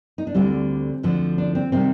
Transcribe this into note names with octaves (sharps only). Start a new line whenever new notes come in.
D#4
D4
D2 D3 G3 C4
D2 D3 F3
D4
C4
C3 D#3 G3 C4